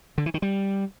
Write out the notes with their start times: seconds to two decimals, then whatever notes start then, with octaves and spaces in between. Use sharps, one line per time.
0.18 D3
0.26 E3
0.34 D#3
0.42 G3